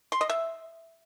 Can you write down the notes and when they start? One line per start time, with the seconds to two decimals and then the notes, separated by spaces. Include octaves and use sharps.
0.12 C6
0.21 D#5
0.30 E5